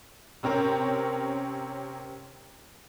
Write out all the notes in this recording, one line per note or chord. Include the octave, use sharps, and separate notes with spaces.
C3 C4 C#4 A#4